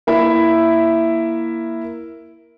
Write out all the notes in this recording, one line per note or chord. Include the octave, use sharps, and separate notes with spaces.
A#3 E4 E5